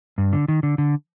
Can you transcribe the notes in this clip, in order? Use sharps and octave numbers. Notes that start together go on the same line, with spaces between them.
G2
D3
D#3
D3
D3